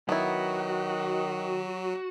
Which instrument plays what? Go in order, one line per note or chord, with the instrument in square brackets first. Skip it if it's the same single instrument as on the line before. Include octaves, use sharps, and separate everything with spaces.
[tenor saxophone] D#3 [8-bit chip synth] F#3 [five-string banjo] B3 E4 [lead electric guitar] F#4